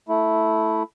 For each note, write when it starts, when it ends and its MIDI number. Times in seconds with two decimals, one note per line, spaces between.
0.09 0.83 57
0.09 0.83 64